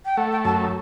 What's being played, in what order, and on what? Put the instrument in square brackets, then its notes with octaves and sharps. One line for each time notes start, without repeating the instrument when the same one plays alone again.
[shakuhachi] G5
[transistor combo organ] A3 [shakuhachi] F#5
[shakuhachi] G5
[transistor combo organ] F#2 [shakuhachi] A5